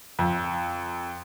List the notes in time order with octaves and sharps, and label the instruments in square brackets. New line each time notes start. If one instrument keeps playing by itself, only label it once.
[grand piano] F2